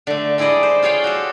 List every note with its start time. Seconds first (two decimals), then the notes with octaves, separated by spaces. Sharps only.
0.07 D3 A3
0.38 G3 E4 G#4 D5 D#5
0.63 C5
0.83 F4 G#4 C#5 F5 G5
1.04 F#4 G4 A4